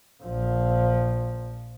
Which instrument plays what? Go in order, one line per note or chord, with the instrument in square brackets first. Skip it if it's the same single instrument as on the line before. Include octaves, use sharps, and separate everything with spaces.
[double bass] A#1 F3